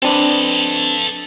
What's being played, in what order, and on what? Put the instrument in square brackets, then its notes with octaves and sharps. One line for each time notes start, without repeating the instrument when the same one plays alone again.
[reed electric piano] C4 D4 B4 [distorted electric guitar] A4 D#5